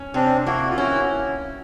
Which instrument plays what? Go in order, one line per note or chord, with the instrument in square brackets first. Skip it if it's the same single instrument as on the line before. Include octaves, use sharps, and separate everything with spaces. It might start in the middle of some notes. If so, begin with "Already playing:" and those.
Already playing: [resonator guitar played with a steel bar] C#4
[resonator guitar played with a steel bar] C3 [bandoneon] C4 D4
[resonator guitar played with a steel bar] A#3 [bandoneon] E4 F#4
[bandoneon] F4
[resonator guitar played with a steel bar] C#4 [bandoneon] E4 F#4